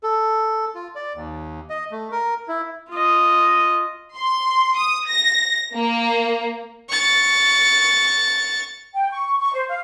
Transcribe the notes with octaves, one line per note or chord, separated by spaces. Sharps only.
A4
F4
D5
D#2
D#5
A3
A#4
E4
F4 D#5
C6
D#6
A#6
A#3
C#6 A6
G5
C#6
C#6
C5
F5